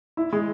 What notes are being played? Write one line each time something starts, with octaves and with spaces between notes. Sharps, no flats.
E4
G#3